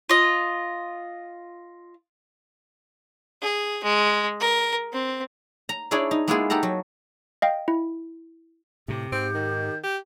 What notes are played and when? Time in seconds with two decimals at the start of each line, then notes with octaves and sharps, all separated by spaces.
0.09 F4 D#5
3.42 G#4
3.83 G#3
4.40 A#4
4.93 C4
5.69 A#5
5.91 D4 E4 G#4 C#5 D5
6.11 D#4
6.28 G#3 A#3 B3 E4 F4 G#4
6.50 D#4 G4 A4 F#5 A#5
6.63 F#3
7.42 D#5 F5 G5
7.68 E4
8.88 A2 C3 G4
9.12 G#2 C4 G6
9.34 D#3
9.83 G4